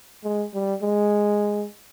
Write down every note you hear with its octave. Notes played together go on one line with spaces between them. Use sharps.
G#3
G3
G#3